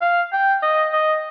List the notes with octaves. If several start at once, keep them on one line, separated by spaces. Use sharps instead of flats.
F5
G5
D#5
D#5